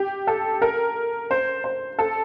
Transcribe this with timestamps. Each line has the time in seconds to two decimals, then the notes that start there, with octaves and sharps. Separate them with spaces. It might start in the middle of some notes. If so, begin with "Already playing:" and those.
Already playing: G4
0.27 A4
0.62 A#4
1.31 C5
1.64 C5
1.99 A4